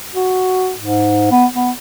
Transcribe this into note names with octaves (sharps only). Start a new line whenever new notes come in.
F#4
G#2
B3
B3